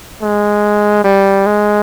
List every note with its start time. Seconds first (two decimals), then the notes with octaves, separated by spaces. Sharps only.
0.22 G#3
1.04 G3
1.46 G#3